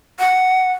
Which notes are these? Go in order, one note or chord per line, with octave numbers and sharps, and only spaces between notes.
F#5